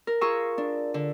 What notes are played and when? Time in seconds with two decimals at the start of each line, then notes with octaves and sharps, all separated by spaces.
0.07 A#4
0.21 F4 G#4 F5 A#5 C#6 E6
0.58 D4
0.94 D3